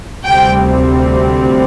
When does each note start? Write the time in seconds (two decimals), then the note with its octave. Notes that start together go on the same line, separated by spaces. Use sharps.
0.25 D2 C3 G3 C4 G5